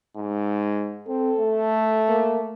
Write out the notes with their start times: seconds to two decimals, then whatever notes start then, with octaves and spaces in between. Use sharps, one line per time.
0.16 G#2
1.08 C4 A4
1.39 A3
2.09 A#3